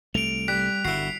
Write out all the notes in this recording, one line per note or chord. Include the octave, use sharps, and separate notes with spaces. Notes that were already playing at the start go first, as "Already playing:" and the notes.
C2 A3 D7 F7
G3 F#6 B6
G1 D3 E4 F#4 C7